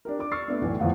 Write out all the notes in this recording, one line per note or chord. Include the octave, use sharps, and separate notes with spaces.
D4 G4 A#4
D4 D6
C#6 E6 F6 A6 C7
A3 B3 D4
B1 A2 E3
E2 A2 F3 F4 F#5